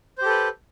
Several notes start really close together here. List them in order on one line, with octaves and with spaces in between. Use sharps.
C5 G4 A4 B4